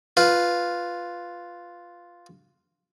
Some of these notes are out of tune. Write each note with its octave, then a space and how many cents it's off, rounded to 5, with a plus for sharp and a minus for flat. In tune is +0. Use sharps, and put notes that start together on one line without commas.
F4 +0 B4 +0